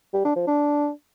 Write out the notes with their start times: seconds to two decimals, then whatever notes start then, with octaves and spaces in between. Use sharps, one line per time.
0.14 G3
0.25 D4
0.36 F3
0.47 D4